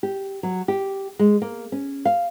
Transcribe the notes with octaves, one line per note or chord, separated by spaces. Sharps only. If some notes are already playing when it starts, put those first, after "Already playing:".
G4
F#3
G4
G#3
A#3
C#4
F5